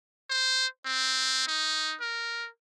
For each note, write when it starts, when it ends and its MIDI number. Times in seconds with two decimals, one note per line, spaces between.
0.30 0.67 72
0.85 1.47 60
1.48 1.96 63
2.01 2.49 70